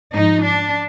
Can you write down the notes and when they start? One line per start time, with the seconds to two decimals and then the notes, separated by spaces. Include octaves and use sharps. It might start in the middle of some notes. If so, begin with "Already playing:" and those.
0.14 G#2 F3 D#4
0.44 D4